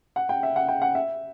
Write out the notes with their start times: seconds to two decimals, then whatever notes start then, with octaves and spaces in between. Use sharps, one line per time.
0.16 F#5
0.29 G5
0.43 E5
0.56 F#5
0.68 G5
0.82 F#5
0.95 E5